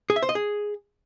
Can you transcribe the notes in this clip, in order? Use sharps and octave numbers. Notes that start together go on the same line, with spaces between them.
G#4
E5
C5
D#5
G#4